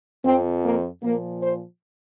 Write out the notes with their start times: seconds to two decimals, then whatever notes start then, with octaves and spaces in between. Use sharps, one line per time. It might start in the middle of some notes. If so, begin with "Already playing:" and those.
0.24 F2 F3 C4
0.63 A#3
1.02 A#2 F3 A#3
1.40 C5